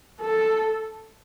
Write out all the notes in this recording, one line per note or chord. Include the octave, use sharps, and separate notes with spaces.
A4